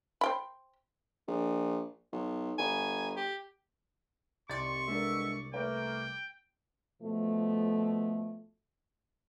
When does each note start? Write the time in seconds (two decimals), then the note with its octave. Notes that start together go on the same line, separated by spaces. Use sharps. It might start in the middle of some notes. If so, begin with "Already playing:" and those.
0.21 C5 G5 B5
1.28 A#1
2.13 B1
2.59 G1 G#5
3.16 G4
4.50 C2 D#3 C4 D5 C6 C#6 A6
4.88 B2 G#3 D4 A4 A#4 E5
5.54 A3 A#3 B4 G5
7.02 B2 F3 A3